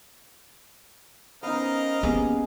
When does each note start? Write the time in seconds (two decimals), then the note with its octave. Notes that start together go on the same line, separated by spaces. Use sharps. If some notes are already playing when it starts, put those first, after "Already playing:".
1.43 B3 C#4 D#4 A#4 C5 D#5 F5
2.03 A#3 B3 C#4 G4 G#4